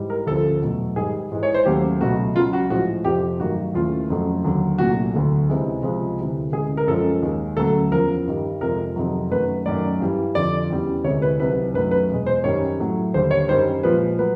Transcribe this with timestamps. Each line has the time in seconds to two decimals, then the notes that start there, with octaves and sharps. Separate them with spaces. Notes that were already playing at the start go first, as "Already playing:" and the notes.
Already playing: G#2 E3 G3
0.10 A#4
0.27 D2 C#3 F3 A4
0.62 E2 B2 F#3 A3
0.96 G#2 D#3 G3 G#4
1.32 G#2 E3 G#3
1.43 C#5
1.54 C5
1.65 D#2 C#3 F#3 A3 G4
2.01 C#2 B2 F#3 A3 F#4
2.35 C#2 C#3 F#3 F4
2.53 F#4
2.70 A2 F3 G#3 F#4
3.04 F2 C3 F3 G4
3.39 G2 D#3 F#3 A3 F#4
3.74 D#2 C#3 E3 A3 F4
4.10 F2 C#3 F#3 A3
4.44 D#2 D3 F#3
4.78 C2 A#2 F#3 A3 F#4
5.14 D2 D3 F#3 A3
5.49 C#2 C3 E3 G#3
5.83 C#2 C3 F3 G#3
6.18 D2 C3 E3 G3
6.52 D2 C#3 E3 G#3 G#4
6.77 A#4
6.87 F#2 C#3 F3 G#3 A4
7.23 D#2 D#3 G#3
7.57 D2 C#3 F#3 A3 A4
7.92 E2 C#3 F3 A#4
8.27 G2 D#3 G3
8.61 F2 C3 F3 G#3 A#4
8.96 F2 C3 D#3 F#3
9.31 F#2 D#3 F#3 A3 B4
9.66 F#2 D#3 F#3 A3 D5
10.00 G2 E3 G3
10.35 F2 D3 F3 D5
10.70 E2 C#3 E3 G3
11.04 D2 C3 E3 G#3 C#5
11.22 B4
11.40 C2 C3 D#3 F#3 B4
11.74 F#2 D#3 F#3 A3 B4
11.91 B4
12.10 E2 B2 G#3
12.26 C5
12.44 F#2 D#3 G3 C#5
12.80 A2 F#3 A3
13.14 D#2 D3 G3 C5
13.31 C#5
13.48 F#2 D#3 G3 C5
13.83 A#2 F3 G#3 B4
14.18 F#3 A3 B4